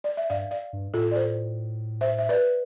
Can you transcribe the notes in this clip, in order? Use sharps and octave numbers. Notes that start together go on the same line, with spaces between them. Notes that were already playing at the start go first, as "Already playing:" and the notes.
D5
E5
G2 D5 F5
D5 F5
G2
A2 F4 A4
D5
A4 C5
C5 E5
E5
B4 D5